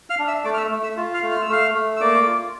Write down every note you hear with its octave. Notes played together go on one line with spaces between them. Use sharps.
F5 F6
D4
E5 E6
A3 D5 D6
F6
E5 E6
A3
E5 E6
F4
F5 F6
A3
F6
E6
A3 F5 F6
A3
E6
A#3 D5 D6
F4